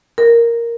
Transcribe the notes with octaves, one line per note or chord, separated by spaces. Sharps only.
A#4